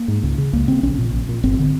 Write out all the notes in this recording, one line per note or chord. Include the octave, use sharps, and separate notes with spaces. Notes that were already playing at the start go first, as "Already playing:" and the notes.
Already playing: A#3
G#2
C#2
C#3
C#2 A#3
C#3 C4
A#1 C#4
A#2
A#1
A#2
G1 C4
D3